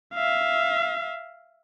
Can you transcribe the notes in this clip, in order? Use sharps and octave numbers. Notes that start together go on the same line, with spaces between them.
E5 F5